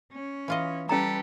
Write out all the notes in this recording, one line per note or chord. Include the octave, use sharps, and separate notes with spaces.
C#4
E3 F4 D#5
G3 C#4 G4 A4 B4 A#5